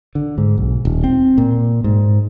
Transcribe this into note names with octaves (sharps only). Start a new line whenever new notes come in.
D3
G#2
B1
D#1
C4
A#2
G#2